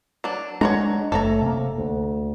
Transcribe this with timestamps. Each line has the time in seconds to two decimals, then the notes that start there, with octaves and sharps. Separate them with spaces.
0.24 F#3 D4
0.61 G#3 D4 C#5 F#5 A#5
1.12 F#1 A3 A4 C#5 A#5
1.42 C3 A#3
1.78 D2